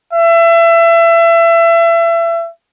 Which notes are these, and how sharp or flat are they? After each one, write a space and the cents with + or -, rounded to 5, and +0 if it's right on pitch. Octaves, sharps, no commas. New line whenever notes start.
E5 +30